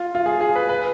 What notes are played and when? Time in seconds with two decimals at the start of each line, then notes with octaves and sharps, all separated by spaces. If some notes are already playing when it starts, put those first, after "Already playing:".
Already playing: F4
0.15 F4
0.26 G#4
0.41 G#4
0.56 B4
0.69 B4